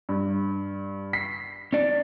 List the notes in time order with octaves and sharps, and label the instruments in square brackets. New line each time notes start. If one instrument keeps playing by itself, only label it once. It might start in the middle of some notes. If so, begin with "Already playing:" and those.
[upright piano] G2
B6 C7
[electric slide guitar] C#4 D5